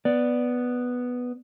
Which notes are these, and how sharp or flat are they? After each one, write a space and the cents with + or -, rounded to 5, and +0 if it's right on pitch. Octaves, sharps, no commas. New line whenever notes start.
B3 +0 D5 +0